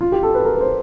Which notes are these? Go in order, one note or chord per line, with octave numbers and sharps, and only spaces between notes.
F4
G4
A4
B4
A#4
B4
C5